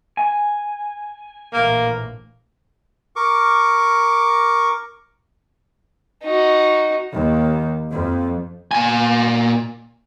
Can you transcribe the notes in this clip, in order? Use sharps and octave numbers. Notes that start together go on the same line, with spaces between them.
G#5
A#1 A2 E3 A#3
A#4 C#6 D6
D#4 F#4
D#2
F2
A#2 G#5